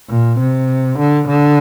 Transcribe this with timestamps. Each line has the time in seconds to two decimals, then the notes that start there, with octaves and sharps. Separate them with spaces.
0.10 A#2
0.39 C3
0.99 D3
1.28 D3